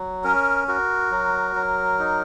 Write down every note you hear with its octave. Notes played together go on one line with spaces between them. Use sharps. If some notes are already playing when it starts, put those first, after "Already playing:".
Already playing: F#3
C#4 A#4
F#4 A#4
F#3
F#3
D#4